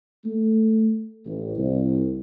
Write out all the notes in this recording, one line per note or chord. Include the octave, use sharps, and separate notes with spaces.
A3
A1
C2